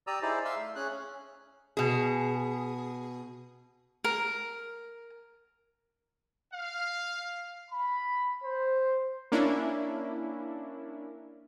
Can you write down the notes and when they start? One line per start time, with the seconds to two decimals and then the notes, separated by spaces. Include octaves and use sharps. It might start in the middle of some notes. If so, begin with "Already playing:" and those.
0.07 G4 D5 A#5 D#6 E6
0.22 D#4 E4 G#4 C5 D5
0.45 E5 F5 C6 E6
0.57 A3
0.76 C#4 G#4 F#6
0.91 C#4
1.77 B2 G#4
4.04 A#4
6.51 F5
7.69 B5
8.42 C5
9.32 A#3 C#4 D4 E4